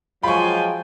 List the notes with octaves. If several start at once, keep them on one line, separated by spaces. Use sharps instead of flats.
F3 F#3 G#3 F4 G5 G#5 B5 C#6